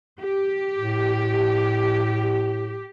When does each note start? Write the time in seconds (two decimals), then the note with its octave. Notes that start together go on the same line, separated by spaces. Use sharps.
0.21 G4
0.78 A2